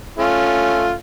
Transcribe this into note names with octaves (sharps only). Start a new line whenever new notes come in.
A3 C#4 F4